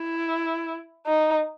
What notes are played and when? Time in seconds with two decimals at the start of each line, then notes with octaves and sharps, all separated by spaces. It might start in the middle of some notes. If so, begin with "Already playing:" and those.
Already playing: E4
1.06 D#4